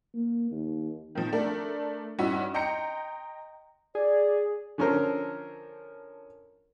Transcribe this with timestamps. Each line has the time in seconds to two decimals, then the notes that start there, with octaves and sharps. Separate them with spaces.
0.14 A#3
0.51 D#2
1.15 D#3 F3
1.32 A3 D4 A#4
2.19 G2 C#4 D#4 E4 F#4
2.54 D#5 G5 A#5 C6 G6 C#7
3.95 G#4 D5
4.78 D3 F3 C#4 A4 A#4 C5